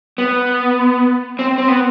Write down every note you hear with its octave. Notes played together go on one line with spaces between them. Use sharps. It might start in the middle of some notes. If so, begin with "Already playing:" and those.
B3
C4
C4
B3